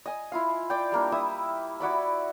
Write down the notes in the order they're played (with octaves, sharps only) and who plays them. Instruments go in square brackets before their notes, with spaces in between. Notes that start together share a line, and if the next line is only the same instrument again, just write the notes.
[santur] D#5 G#5
E4 F4 F5
D5 G5
G3 A#3 D4
E4 E5 D#6
E4 F#4 D5 B5